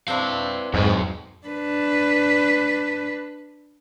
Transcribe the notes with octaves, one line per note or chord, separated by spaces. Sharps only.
C4 D4 E4 B4 F5
F2 G#2 F#3 B4
D4 B4